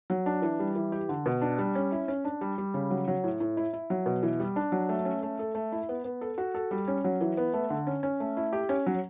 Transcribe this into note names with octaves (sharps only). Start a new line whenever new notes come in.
F#3
D4
E3
G3
E3
G4
D3
B2
D4
G3
C#4
E4
C#4
D4
G3
G3
C#3
F#3
F#3
A2
A2
E4
E4
F#3
B2
E3
G3
D4
F#3
A3
C#4
A3
A4
A3
E4
B3
B3
A4
F#4
A4
G3
C#4
F#3
E3
B3
A3
D3
C#4
C#4
A3
E4
G4
C#4
F#3